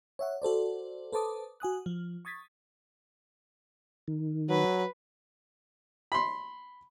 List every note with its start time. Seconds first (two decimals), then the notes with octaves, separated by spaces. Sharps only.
0.19 C#5 E5 F#5
0.42 F#4 A4 C5 D5
1.12 A4 B4 C5 A5 D6 D#6
1.60 F#4 G#5 D#6 F#6
1.86 F3
2.25 C#6 D#6 G#6 A6 B6
4.08 D#3
4.49 F#3 B4
6.12 B5 C6